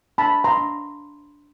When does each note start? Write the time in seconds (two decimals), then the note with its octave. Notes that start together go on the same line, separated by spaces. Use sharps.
0.18 D4 A5 B5
0.44 A#5 C6
0.57 D4